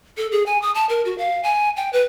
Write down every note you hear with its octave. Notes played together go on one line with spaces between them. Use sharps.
A4
G#4
G#5
D#6
A5
A#4
F#4
F5
G#5
G5
B4